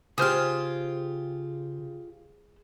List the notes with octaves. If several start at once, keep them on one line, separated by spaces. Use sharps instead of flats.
C#3 F4 G4 G#4 C5 F6